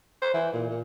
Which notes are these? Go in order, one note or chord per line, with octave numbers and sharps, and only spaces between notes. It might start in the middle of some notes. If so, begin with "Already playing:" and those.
C5
E3
A#2
A#2